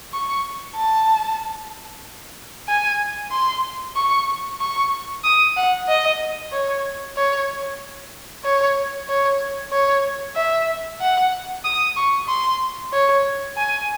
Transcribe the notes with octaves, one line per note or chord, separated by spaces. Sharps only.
C#6
A5
G#5
C6
C#6
C#6
D#6
F#5
D#5
C#5
C#5
C#5
C#5
C#5
E5
F#5
D#6
C#6
C6
C#5
G#5